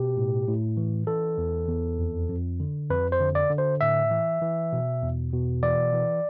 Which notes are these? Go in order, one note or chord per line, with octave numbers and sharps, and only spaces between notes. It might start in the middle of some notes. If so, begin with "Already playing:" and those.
Already playing: B2 G4
A2
A2
E3
E3 A4
E2
E2
F2
F2
D3
F2 B4
C5
D3
D5
D3
C5
A2 E5
E3
E3
B2
E2
B2
E3 D5
E3